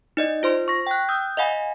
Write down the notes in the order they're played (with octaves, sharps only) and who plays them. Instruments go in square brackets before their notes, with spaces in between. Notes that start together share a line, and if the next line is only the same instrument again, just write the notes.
[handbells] D#4 D5 D#5
F4 C5 C6
C#6 A#6
G5 F#6
D#6 E6 G6
D#5 F5 F#5 G#5 B5